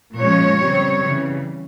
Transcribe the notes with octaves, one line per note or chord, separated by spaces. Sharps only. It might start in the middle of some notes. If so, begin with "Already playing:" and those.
A#2 F3 G#3 C#4 C#5
C#3 G3 C4
C#3 E3 G3